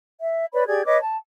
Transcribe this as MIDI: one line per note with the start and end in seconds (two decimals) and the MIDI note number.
0.20 0.46 76
0.53 0.64 71
0.53 0.64 73
0.53 0.64 74
0.53 0.64 83
0.67 0.84 67
0.67 0.84 68
0.67 0.84 74
0.67 0.84 92
0.86 0.98 71
0.86 0.98 73
0.86 0.98 75
0.86 0.98 86
1.00 1.16 81